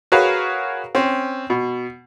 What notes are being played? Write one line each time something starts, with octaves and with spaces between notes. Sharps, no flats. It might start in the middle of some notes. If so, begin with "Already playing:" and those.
F#4 G#4 A#4 B4 C#5 F5
C4 C#4
B2